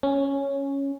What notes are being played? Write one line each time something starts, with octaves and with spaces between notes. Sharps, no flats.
C#4